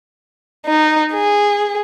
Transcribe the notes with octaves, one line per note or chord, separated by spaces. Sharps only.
D#4
G#4